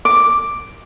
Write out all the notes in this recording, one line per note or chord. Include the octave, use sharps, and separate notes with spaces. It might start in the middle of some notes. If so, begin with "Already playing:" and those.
D6